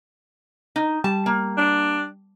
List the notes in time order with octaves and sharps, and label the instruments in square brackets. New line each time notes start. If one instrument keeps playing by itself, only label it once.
[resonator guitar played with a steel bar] D#4
[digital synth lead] G3 [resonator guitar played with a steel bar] A5
[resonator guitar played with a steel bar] A#3
[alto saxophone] D4